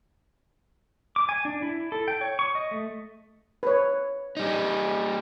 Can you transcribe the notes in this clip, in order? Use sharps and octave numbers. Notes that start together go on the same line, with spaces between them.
D6
G#5
D4
E4
A4
G5
C#5
C#6
D#5
A3
B4 C#5
G3 D#4